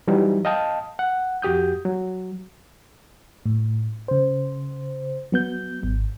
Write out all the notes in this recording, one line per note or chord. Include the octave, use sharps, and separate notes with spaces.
E3 F#3 G3 D#4 E4
D#5 F5 G5 A5 D#6
F#5
F2 F#4 G4 D#6 G6
F#3
A2
C#3 C5
F#3 B3 G6
G#1